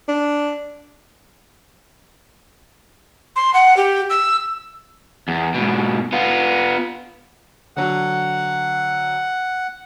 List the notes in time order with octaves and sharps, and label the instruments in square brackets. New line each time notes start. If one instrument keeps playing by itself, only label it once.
[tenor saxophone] D4
[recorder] C6
F#5
G4
E6
[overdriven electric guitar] E2
G#2 B2
B3 F4
[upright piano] D3 F#3 [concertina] F#5